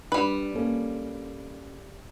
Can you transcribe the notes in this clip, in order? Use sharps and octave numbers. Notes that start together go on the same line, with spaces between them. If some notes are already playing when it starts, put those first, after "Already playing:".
G3 D4 B4
A#3 C#4 A4